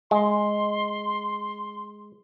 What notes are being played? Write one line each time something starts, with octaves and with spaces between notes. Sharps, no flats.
G#3 C6